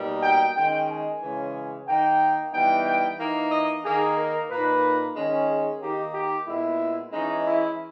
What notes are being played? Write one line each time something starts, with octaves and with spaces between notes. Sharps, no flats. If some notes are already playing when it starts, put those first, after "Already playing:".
Already playing: B2 G3 A#3 D#4
G5
D#3 G#3 C#4 G5
G#5
C#3 E3 G#3 C#4
D#3 A#3 D#4 G5
E3 G3 B3 D#4 G5
G5
E3 A#3 D#4
D#5
D#3 A#3 D#4 G#4
A#4
A#2 A#3 D#4 B4
D#3 G#3 C#4
G#4
D#3 A#3 D#4 G4
G4
A#2 G#3 B3 E4
E3 G#3 C#4 D#4
E4